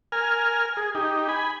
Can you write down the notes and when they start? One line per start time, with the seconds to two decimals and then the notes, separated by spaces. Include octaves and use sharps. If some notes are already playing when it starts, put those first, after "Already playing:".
0.12 A#4 G#5 F6
0.77 G#4
0.95 D#4 G4
1.29 G#5 B5